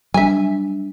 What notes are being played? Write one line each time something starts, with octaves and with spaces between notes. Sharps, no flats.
F#3 G3 D4 E5 G#5